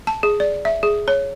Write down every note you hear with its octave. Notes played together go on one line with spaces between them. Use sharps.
A5
G#4
D5
E5
G#4
C#5